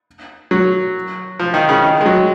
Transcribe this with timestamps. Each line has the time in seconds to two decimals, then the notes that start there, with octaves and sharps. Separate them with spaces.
0.51 F#3
1.39 F3
1.54 D#3
1.69 C#3
1.84 D#3
2.01 G#3
2.06 F#3